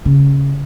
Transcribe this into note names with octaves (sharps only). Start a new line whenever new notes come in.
C#3